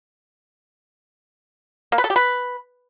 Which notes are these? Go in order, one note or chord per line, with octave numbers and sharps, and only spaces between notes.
A#3
B4
A4
G4
B4